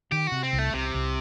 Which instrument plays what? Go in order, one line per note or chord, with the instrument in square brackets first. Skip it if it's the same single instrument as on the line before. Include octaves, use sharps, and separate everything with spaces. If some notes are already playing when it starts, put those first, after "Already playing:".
[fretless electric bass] D#3 [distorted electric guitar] G4
[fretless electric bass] C3 [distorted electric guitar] F#4
[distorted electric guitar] C4
[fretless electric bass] C2
[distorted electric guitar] A3
[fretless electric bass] C2 [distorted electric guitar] C3
[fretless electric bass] C2